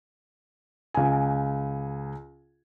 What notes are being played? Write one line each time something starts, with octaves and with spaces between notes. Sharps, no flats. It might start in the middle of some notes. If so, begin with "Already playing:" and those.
C#2 G#5